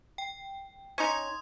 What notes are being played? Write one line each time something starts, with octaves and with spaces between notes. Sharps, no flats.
G5
C#4 D#4 C6 D#6 G#6